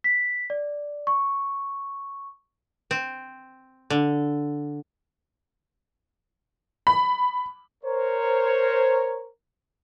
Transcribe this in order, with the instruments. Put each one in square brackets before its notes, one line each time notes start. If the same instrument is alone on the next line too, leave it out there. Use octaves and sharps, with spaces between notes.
[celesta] B6
D5
C#6
[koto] C4
D3
[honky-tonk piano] B5
[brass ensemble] A#4 C5 C#5